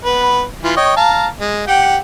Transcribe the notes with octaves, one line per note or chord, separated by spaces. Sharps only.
B3 B4
E3 F4
C#5 D#5 G5
F5 A5 A#5
G#3
G4 F#5 G5